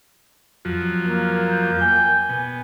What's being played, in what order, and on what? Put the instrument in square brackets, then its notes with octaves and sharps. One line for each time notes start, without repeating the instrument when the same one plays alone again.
[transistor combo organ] F2 F3 F#3
[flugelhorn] A#3
[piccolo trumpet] G6
[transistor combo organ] G5 [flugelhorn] G#5
[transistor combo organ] B2